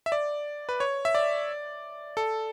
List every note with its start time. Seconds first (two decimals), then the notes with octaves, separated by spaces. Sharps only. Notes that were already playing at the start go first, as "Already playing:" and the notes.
0.06 E5
0.12 D5
0.69 B4
0.80 C#5
1.05 E5
1.15 D5
2.17 A4